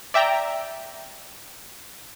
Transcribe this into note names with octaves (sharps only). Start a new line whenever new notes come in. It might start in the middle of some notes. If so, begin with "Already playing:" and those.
D5 E5 G5 A#5